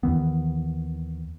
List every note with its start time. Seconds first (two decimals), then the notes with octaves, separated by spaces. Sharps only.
0.03 D#2 D#3 E3 B3